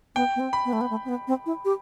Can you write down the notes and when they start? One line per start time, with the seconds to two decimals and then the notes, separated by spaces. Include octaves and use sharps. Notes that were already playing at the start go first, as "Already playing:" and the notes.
0.15 B3 G5
0.36 B3
0.40 C4
0.53 B5
0.65 B3
0.73 A3
0.81 B3
0.90 A3
1.05 C4
1.09 B3
1.28 C4
1.46 E4
1.65 G4